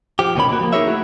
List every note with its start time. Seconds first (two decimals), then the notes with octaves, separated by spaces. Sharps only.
0.19 F3 G4
0.35 D2 B2 D#3 C#4 B5
0.49 D3 A#3 F#4
0.61 F3 A#3
0.73 D#4 G#4 A#4 C#5 E5
0.87 A3 E4 F#4